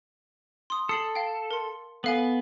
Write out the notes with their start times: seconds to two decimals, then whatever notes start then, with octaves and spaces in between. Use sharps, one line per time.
0.70 C6 D#6
0.89 A4 D#6 C7 F#7
1.15 F5 G5
1.51 A#4 C6
2.04 B3 A4 F5 G#5